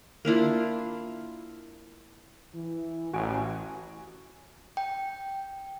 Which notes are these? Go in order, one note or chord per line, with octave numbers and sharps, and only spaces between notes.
A#3 D4 E4 F4
E3
A1 F#4 G#5 D7
G5